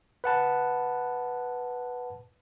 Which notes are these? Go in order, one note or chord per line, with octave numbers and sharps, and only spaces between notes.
B4 F#5 A5